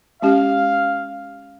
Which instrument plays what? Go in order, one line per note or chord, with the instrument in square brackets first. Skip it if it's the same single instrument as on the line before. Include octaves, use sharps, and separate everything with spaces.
[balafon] G#3 C#4 G4 [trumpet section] F5